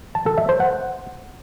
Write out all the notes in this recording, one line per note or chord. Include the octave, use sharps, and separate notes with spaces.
A5
A4
E5
C5
F#5